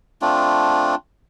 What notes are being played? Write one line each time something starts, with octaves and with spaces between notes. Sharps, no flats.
A3 C4 D4 F4